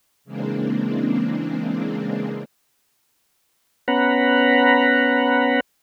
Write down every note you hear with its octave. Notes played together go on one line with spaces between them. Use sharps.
C#3 E3 G#3 A#3 C4 D4
B3 C#4 F#5 A#5 B5